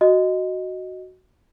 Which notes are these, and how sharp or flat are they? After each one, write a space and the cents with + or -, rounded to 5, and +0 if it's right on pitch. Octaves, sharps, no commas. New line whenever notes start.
F#4 +0 D#5 +0